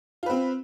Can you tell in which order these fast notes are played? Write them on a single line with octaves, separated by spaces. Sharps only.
F4 B4 C4